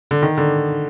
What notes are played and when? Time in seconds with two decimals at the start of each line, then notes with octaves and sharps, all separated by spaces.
0.11 D3
0.22 D#3
0.38 D3